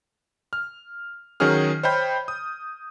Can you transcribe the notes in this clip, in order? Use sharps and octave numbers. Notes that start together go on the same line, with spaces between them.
F6
D#3 F#3 C#4 F#4 G#4 F6
C5 C#5 D#5 G5 B5 G6
D#6